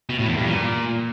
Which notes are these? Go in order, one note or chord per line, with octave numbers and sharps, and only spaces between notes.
B2
A2
E2
G2
A#2